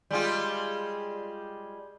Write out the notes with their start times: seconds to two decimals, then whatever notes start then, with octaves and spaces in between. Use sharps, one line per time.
0.11 G3 G#3 F4